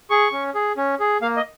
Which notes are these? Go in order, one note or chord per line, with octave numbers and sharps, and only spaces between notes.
G#4 C#6
C#4
G#4
C#4
G#4
A#3 F5
D#5